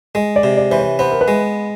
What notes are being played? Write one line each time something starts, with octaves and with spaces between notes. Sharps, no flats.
G#3 D#5
D5
C3
D5
E3 C5
C#5
B3 C5
A#4
B4
G#3